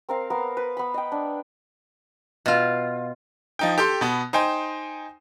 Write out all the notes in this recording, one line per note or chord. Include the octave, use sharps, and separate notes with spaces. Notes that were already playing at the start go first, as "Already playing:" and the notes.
C4 A#4 F5
B3 A#4 F5
B4
B3 B5
D#5 G5
D4
B2 F4
F3 D#4 G5
G4 A4 G5 C6
B2 B3
D#4 C5 G5 G#5